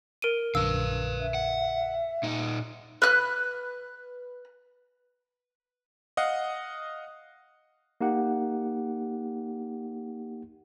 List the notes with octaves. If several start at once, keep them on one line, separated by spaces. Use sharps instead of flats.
A#4 D7 D#7
A#1 F#2 D3 B4 F5 E6
E5
F#5
A#2 D#4
B4 F6 F#6
D#5 F5 F#5
A#3 D#4 G4 F#5